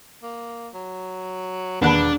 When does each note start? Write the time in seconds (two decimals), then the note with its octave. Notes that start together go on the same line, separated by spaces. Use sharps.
0.23 A#3
0.74 F#3
1.82 E1 D#2 B3 D4 F#5 A5 B5